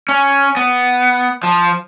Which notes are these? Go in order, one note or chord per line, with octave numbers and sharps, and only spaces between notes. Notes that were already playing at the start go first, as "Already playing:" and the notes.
C#4
B3
F3